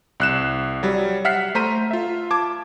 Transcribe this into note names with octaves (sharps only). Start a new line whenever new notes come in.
C2 F#6 E7
F#3 G3
E5 F#5 F6 B6 C7
A3 C5 A#5 B6 D#7
F4 E5
A5 D6 G#6